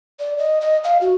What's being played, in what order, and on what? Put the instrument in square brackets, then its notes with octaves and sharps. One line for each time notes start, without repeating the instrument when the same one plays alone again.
[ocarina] D5
D#5
D#5
F5
F#4